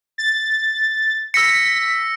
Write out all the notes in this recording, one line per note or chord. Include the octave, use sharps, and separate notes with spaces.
A6
E6 A#6 B6 C#7